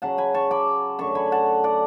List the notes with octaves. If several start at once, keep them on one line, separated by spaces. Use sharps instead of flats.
C#3 F#3 C#4 F#5 A5
G#5 B5
A5 C#6
B5 D6
F#2 D3 A3 A5 C#6
G#5 B5
F#5 A5
D5 F#5